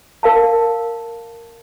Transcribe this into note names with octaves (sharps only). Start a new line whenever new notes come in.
A#4 F5 A5